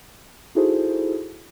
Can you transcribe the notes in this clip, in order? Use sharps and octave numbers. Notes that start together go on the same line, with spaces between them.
D#4 E4 F#4 G#4 A4 C5